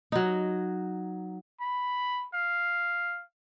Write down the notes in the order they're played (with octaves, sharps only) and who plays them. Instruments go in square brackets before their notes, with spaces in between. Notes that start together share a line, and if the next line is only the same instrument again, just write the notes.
[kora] F#3 D#4
[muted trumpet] B5
F5